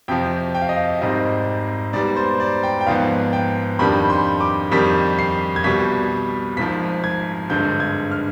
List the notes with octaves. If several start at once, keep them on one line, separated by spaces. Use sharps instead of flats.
F2 C3 F3 G5
G5
F5
D#5
F5
G#1 G#2 G3 C4 D#5
G#2 G3 B3 D5
C5
D5
G5
G5
G#1 G#2 F3 B3 F5
G5
F2 D#3 G3 D4 B5
C6
D6
F2 D#3 G3 B6
C7
G#6
C2 B2 G3 B6
G#1 G#2 F3 B6
G#6
G#1 G2 D3 G#3 G6
G#6
F6